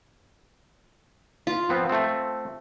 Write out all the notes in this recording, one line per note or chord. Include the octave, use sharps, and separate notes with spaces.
F4
F3 B3 C4
A3 C4